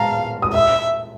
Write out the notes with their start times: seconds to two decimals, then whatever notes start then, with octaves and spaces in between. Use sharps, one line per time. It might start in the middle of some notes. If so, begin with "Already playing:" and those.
Already playing: F5 A5 A#5
0.42 D#6
0.53 E5 E6